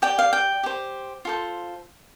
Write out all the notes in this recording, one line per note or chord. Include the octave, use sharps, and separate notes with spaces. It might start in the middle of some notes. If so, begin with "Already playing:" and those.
G4 D5 G5
F5
G5
G4 C5
F4 A4 C5